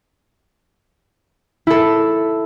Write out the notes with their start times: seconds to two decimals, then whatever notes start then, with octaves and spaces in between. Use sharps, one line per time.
1.67 E4 A4